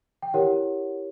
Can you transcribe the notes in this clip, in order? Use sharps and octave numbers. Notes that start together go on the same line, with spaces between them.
G5
E4 G4 A#4 C#5 F#5